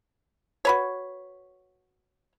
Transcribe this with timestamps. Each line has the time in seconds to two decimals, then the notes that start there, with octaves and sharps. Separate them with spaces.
0.65 F#4 B4 C#5